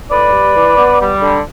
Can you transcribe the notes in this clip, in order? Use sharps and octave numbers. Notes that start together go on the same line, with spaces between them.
A2 B4 D5
G3
E3
B3
G3
D3